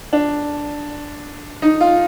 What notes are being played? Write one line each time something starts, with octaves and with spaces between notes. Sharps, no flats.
D4
D#4
F4